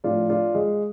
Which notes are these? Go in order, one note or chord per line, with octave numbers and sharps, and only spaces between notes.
A2 F3 D4 F4
D4 F4
G#3